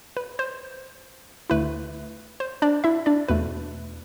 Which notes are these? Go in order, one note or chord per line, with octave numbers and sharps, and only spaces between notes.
B4
C5
D2 D3 A3 E4 B4
C5
D4 D5
E4 E5
D4 D5
E2 B2 A3 B4